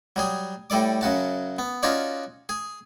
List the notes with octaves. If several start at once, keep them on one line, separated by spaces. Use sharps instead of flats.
F#3 G3 G#4
A2 G3 A4 D5 D6
F#2 C#3 F#4 A5
B3
C#4 D#4 F4 F#4 C#5 D5
G#4